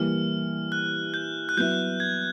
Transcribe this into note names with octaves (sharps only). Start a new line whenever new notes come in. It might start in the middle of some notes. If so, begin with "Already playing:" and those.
Already playing: E3 G3 A#3 F6
F#6
G6
F#6
F#3 B3 E4 G6
G#6